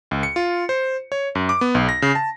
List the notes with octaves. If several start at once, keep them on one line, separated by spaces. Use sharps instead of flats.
C#2
C#7
F4
C5
C#5
F#2
D6
B3
B1
A#6
C#3
A5